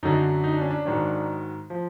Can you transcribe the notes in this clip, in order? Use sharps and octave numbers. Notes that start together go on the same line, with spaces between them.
F#2 D3 F#3 D#4
D#4
D4
C#4
D4
G#2 D#3 F#3
F3